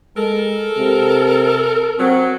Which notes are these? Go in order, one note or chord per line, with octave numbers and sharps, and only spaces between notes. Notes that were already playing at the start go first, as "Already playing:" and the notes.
G#3 A4 A#4
C3
F#3 C4